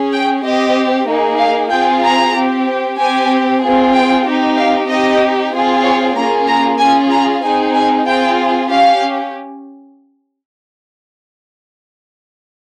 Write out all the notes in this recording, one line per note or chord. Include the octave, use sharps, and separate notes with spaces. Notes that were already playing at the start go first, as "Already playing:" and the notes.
Already playing: C#4 G#4
G5
C4 G4 D#5
A#3 D#4 G#4
F5
C4 F4 G#4 G5
A#5
C4 G4
C4 G4 G#5
C4 F4 G#4
G5
C4 D#4 G4
F5
C4 D#4 G4 D#5
C4 F4 G#4
C#5
A#3 C#4 F4 G#4 A#5
A#5
C#4 F4 G#4 G#5
A#5
C4 D#4 G#4 G#5
G#5
C4 F4 G#4 G5
C#4 G4 F5